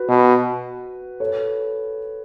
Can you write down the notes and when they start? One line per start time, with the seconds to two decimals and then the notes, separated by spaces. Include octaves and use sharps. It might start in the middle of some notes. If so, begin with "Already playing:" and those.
Already playing: F#4 B4
0.09 B2
1.20 A4 C#5